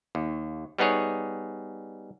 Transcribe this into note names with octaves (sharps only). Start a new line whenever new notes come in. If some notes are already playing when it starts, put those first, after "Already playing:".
D#2
G3 B3 D#4 G#4 C#5